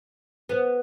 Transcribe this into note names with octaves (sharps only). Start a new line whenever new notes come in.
B3